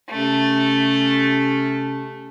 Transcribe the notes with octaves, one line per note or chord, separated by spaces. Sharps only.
C3 A3 C#4